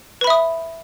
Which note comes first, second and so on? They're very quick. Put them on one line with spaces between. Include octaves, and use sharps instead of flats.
B4 B5 E5 D#6